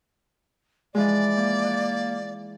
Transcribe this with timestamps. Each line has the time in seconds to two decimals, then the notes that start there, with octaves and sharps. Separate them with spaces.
0.95 E3 F3 G#3 D5
1.35 A#3
1.64 F#6